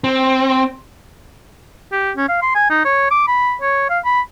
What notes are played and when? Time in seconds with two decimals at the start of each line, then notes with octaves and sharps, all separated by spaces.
0.04 C4
1.92 G4
2.17 C#4
2.29 F5
2.42 C6
2.55 G#5
2.70 D#4
2.85 C#5
3.11 D6
3.28 B5
3.62 C#5
3.90 F5
4.05 B5